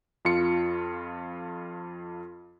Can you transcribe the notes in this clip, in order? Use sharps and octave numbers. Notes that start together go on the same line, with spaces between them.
F2 F4 C#7